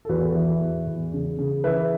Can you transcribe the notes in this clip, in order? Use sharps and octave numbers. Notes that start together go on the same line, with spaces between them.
A4
E2 F#4 B4
E3
E2
E2
C#3
C#3
E3 B4 E5